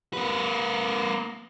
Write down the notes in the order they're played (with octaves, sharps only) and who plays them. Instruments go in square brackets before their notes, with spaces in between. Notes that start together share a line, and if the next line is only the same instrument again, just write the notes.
[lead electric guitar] A#3 B4